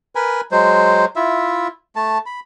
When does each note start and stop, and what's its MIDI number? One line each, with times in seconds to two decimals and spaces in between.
0.15 0.41 70
0.15 0.41 71
0.15 0.41 80
0.15 0.41 83
0.52 1.05 54
0.52 1.05 56
0.52 1.05 72
1.16 1.68 64
1.16 1.68 65
1.16 1.68 76
1.96 2.18 57
1.96 2.18 81
2.26 2.40 83